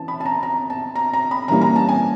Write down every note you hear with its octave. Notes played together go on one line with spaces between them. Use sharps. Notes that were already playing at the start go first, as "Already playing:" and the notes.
Already playing: E3 C#4 A5
B5
A5
A#5
A#5
A5
A#5
A#5
B5
E3 G3 A#3 C#4 A#5
A#5
A5
G#5